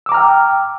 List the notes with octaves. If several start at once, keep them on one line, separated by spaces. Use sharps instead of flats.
G5 A#5 D6 E6 F6